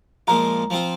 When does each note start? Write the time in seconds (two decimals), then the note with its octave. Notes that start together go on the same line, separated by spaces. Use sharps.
0.27 A#2 F3 G#3 F4 A#5
0.70 F3 C4 F4